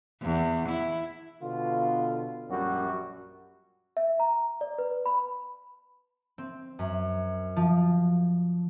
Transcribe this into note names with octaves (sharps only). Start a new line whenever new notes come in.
E2
E4
B2 D3 F4
A#1 F#2 G3 C#4 F#4
E5
A#5
D5
B4
B5
C4
F#2
F3